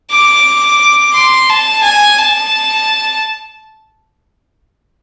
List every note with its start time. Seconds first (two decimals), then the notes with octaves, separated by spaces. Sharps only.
0.12 D6
1.15 C6
1.50 A5
1.83 G#5
2.18 A5